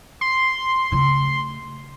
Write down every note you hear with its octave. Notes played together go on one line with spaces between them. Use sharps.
C6
C#3 A3